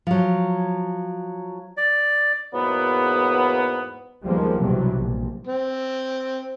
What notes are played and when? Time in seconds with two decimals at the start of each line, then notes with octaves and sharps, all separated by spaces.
0.07 F3 F#3
1.77 D5
2.54 E2 G#2 F#3 A#3 B3
4.24 D#2 F3 G3 G#3 A#3 B3
4.59 B1 G2 C3 E3 F#3 G3
4.95 A#1
5.47 C4